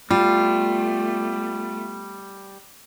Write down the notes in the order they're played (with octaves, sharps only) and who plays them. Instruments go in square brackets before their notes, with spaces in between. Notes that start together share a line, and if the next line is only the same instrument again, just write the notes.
[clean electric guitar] G3 [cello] A3 B3 [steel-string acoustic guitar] F4